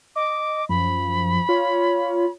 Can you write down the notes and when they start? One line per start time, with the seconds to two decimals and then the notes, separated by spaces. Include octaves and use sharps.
0.16 D#5 D6
0.69 F#2 F3 B5
1.49 F4 C#5